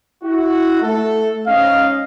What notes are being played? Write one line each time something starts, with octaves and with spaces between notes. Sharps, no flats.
E4 F#4
A3 A4
G#2 C#4 D#5 F5